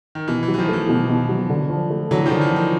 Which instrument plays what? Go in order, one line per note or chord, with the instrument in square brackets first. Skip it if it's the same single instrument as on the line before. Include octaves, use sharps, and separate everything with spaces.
[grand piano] D#3
[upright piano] B2 [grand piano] E3
[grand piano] E3
[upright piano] F#3
[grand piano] E3
D#3 F3
[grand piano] E3 [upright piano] A3
[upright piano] B2
B2
F#3
D3
F3
A3
[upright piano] D3 [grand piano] E3 F#3
[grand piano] D#3 F3
[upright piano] D3
[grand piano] E3
[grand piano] D#3 [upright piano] F3